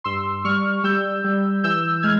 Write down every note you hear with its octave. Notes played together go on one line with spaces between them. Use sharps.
G2 C6 E6
G3 C#6 F6
G3 E6 G6
G3
E3 E6 G6
G#3 F6 G#6